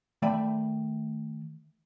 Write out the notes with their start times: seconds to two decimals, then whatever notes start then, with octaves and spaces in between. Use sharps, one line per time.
0.22 D#3 A3 D5 E5 G5 B5